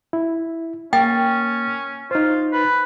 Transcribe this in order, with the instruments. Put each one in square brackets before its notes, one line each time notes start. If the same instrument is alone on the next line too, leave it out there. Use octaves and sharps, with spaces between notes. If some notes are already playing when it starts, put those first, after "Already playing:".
[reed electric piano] E4
[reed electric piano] A#3 A6 [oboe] C#4 [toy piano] G5
[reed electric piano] D#4 C5 [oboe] F4
[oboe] B4